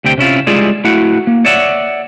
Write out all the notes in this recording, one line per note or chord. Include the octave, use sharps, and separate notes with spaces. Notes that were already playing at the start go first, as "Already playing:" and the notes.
D2 C3 C4 G5
C3 C#4 E4 F4
G3 G#3 E4 F4 G#4 D5
A3 E4 F#4 F#5
A#3
C#5 D5 E5 F#5